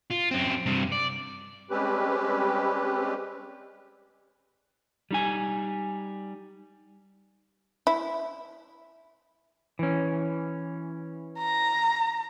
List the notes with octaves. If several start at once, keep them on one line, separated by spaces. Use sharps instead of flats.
F4
F#2 C4
G2 C3
D5
G3 G#3 C4 C#4 G4 B4
G3 D#4 G#5
E4
E3 C#4
A#5